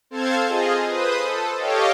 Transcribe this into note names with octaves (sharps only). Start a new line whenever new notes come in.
C4 A4 C5 F5 A5 G#6
F4 G#4 D#5
B4 C5 D#6
A4
G4 A4 C#5 D#5 F5 G5